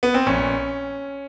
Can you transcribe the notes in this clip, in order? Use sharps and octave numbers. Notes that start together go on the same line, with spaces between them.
B3
C4
A#1 C#4